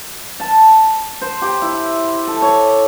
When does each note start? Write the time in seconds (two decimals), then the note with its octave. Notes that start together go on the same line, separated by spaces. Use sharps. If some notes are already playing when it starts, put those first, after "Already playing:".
0.40 A5
1.21 C5
1.42 G4
1.62 E4
2.27 A4
2.42 C#5